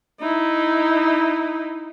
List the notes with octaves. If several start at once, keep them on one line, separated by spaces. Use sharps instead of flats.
D#4 E4